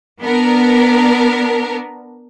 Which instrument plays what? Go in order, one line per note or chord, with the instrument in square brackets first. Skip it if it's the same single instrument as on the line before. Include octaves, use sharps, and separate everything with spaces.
[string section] B3 D4 A#4